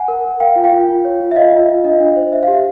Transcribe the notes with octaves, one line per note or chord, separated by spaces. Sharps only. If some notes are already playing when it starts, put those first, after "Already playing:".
Already playing: F#5 G#5
A#4
A#4
A#4 F5 G5
F4
F5 G5
F4
F4
C#5
F4
E5
F4 D#5 F5
F4
F4
D4 D#5
D4
C5
C5 E5
G4 F5
E5